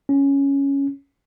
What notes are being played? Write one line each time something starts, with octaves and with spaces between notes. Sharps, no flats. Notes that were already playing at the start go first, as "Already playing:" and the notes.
C#4